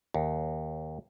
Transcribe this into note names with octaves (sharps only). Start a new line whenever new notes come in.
D#2